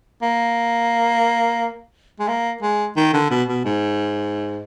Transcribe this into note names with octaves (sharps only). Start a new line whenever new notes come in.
A#3
G#3
A#3
G#3
D#3
D3
B2
B2
G#2